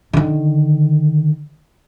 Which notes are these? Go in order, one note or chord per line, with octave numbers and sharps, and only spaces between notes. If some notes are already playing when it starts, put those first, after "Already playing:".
D3 D#3